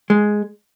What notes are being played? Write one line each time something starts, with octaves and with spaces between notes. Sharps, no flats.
G#3